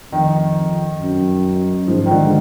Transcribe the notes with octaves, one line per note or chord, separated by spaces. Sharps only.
F2 D#3
F#2
G#2 F3
D#3
D3